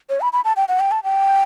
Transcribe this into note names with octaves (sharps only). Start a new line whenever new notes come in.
C#5
B5
B5
A5
G5
F#5
G5
A5
G5